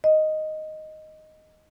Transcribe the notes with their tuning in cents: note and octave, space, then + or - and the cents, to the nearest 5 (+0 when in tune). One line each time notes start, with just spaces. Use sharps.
D#5 +0